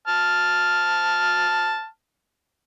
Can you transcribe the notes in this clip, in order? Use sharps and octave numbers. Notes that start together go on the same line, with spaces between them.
A5 F6